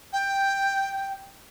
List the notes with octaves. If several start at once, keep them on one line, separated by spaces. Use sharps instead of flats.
G5